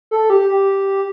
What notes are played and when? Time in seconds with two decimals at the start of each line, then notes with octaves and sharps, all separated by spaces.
0.11 A4
0.30 G4
0.49 G4